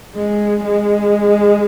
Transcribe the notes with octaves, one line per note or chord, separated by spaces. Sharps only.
G#3
G#3